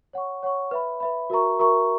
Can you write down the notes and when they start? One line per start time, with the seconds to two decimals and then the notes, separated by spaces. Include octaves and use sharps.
0.13 C#5 F#5 C#6
0.43 C#5 F#5 C#6
0.71 B4 E5 B5
1.00 B4 E5 B5
1.30 F#4 A#4 E5 A#5 C#6
1.59 F#4 A#4 E5 A#5 C#6